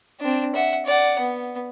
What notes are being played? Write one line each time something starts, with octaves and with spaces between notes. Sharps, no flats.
C4 D4
E5 F#5
D5 F#5
B3